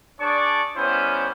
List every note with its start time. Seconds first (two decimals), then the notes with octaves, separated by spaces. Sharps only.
0.19 D4 G#4 D5 A5 C#6
0.76 G3 B3 C#4 E4 C5